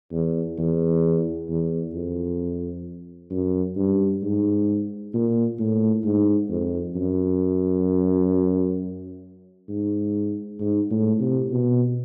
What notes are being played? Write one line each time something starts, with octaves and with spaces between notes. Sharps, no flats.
E2
E2
E2
F2
F#2
G2
G#2
A#2
A2
G#2
F2
F#2
G#2
G#2
A2
C3
B2